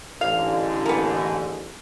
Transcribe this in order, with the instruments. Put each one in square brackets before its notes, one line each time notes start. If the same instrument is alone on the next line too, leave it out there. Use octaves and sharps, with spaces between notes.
[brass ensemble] A1 G#2 D3 [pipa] F5
[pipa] A#3 B3